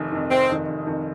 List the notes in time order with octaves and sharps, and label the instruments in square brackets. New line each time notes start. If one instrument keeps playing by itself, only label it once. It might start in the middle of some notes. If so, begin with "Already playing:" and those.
Already playing: [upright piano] F1 F2 D#3
F2 D#3
[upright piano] F1 [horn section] C4
[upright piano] F2 D#3
F1
F2 D#3